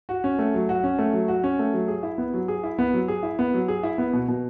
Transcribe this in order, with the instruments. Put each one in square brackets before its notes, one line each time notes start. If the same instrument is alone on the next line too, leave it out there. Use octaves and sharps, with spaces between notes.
[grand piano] F#4
C#4
A3
F#3
F#4
C#4
A3
F#3
F#4
C#4
A3
F#3
G#4
E4
B3
F#3
G#4
E4
B3
F#3
G#4
E4
B3
F#3
G#4
E4
B3
B2
B2